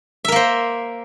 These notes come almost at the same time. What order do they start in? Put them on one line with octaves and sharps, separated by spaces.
E5 A#4 A#3 C5